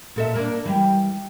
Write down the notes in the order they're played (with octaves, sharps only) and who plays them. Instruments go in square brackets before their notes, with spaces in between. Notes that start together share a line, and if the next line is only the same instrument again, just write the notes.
[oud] A#2 A4 E5
A#3 D4
E3 G3 G4